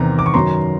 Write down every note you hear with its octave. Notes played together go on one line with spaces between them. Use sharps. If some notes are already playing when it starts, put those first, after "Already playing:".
Already playing: E2 C3 D#3 A#5
D6
C#6
F#2 D#3 F#3 A#5 C6